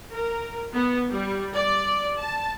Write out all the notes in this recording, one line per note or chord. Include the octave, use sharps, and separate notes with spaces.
A#4
B3
G3
D5
A5